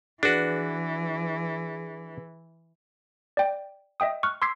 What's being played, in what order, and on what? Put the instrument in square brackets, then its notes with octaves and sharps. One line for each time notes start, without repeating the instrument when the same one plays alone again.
[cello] E3 [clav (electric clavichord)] D4 F#4 [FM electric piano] G#4 B4
[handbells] D5 G5
D#5 E5 G5 D#6
C#6 F6 F#6
C6 D6 E6 G#6 B6 C7